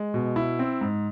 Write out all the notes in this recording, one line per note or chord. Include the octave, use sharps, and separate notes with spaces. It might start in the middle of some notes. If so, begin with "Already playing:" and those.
Already playing: G#3
B2
E4
C4
G#2